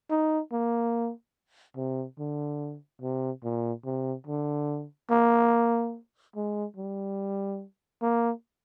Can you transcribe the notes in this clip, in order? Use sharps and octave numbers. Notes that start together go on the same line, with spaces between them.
D#4
A#3
C3
D3
C3
A#2
C3
D3
A#3
G#3
G3
A#3